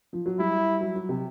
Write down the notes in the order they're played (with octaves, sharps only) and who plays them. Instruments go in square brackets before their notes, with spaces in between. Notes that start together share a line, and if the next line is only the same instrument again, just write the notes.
[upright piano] F3
F#3
[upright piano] G3 [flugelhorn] E4
[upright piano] F#3
F#3
C3